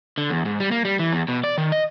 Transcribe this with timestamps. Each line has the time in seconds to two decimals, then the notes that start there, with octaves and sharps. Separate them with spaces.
0.18 D3
0.30 E2
0.45 G#2
0.60 G3
0.71 A#3
0.85 G3
0.99 E3
1.13 E2
1.28 B2
1.44 D5
1.58 D#3
1.72 D#5